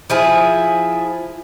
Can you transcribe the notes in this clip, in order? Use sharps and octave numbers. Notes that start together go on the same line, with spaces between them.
F3 E4 G#4